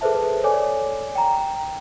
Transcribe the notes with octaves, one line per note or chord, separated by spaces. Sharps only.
G#4 A4 B4 C5 E5 A5
A4 C#5 D5 G#5 D6
G5 A#5